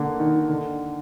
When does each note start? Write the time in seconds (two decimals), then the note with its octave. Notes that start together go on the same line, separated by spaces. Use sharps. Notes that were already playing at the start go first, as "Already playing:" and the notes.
Already playing: D3 A#3
0.20 D#3
0.48 D3